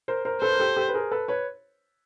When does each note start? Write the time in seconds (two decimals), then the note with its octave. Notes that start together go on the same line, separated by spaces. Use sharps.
0.08 A#4 C5
0.25 A#4 C5
0.42 A4 B4 C5
0.52 A#4
0.59 G4 A4
0.76 G4 A4
0.89 B4
0.94 G#4 A#4
1.11 A4 B4
1.28 B4 C#5